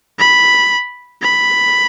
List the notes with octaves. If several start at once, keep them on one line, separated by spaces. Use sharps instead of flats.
B5
B5